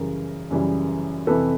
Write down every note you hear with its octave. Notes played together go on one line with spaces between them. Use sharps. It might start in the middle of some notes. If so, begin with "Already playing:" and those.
Already playing: F#2 C#3 E3 G3 G#4 A#4
F#2 C#3 E3 G3
F2 C3 E3 A4 B4